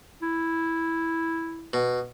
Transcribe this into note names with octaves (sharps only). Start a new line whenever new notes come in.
E4
B2